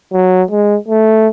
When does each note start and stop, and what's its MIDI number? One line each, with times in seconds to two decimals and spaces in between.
0.13 0.43 54
0.51 0.77 56
0.88 1.28 57